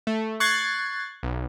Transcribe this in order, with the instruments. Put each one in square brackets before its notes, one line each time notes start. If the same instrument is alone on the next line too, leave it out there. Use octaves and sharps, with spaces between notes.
[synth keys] A3
C#6 F#6 G#6 A6 C7
B1